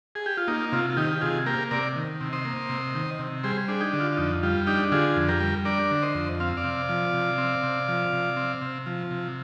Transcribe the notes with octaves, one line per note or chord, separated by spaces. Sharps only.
G#4
G4
F4
A#3 D#4
C3 F4
F4
D#3 D#4 G4
G4
C3 F4 G#4
A#3 G4 A#4
C3 A#4 D5
D#3
C3
C5 D#5
A#3
C3
D#3
C3
G3 G#4 C5
D4 G#4
D#4 G4
D3
F4
F4
F2 D#4
G3 F4
D4 D#4 G4
D3 F4 G#4
F2
G4 A#4
G3
D4 A#4 D5
D3
C5 D#5
F2
C4 F5
D5 F5
C3
F3
C3
C4
C3
F3
C3
C4
C3
F3
C3